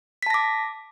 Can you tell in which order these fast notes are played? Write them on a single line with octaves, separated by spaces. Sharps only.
B6 A5 A#6 D6